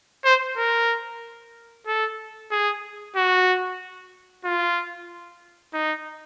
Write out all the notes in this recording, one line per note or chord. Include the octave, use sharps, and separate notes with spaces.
C5
A#4
A4
G#4
F#4
F4
D#4